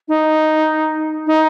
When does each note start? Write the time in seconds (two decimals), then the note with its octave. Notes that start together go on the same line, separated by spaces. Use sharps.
0.08 D#4
1.27 D#4